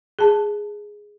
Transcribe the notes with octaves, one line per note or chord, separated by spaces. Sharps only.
G#4 A5